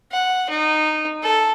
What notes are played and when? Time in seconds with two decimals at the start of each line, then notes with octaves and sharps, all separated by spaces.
0.12 F#5
0.50 D#4
1.23 A4